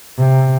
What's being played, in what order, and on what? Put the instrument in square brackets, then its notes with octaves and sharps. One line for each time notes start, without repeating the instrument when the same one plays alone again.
[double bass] C3